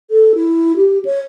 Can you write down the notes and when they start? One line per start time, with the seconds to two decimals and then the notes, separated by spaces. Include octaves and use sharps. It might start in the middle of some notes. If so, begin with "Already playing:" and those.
0.11 A4
0.35 E4
0.76 G4
1.05 C#5